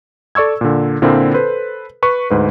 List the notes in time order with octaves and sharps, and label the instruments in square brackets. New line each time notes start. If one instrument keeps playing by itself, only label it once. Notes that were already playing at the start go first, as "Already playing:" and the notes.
[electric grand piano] A4 D5 C#6 E6 G#6
A#2 D3
A#2 D3 C4 E4 F4 A#4
A4 B4 C5
B4 C#6
D2 G#2 B4